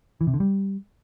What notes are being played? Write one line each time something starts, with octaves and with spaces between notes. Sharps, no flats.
E3
C3
D3
G3